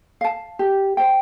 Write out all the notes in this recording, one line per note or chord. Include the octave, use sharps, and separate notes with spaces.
F5 A5
G4
C5 G5